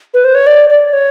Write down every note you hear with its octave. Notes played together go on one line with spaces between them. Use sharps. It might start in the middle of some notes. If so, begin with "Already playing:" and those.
B4
C5
C#5
D5
D5
C#5